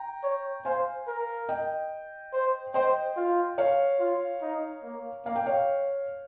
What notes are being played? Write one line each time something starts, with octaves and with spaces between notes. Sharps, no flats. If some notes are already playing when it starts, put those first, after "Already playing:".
Already playing: G5 A#5
C#5
C5 F5 G#5
A#4
D#5 G5
C5
C5 D#5 G5
F4
C#5 F5
F4
D#4
A#3
A#3 F5
G5
C#5 F5